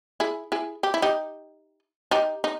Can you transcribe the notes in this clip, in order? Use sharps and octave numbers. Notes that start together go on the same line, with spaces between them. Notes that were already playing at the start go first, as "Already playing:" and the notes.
E4 G#4
E4 G#4
G4
E4
D#4 G4
D#4 G4
D#4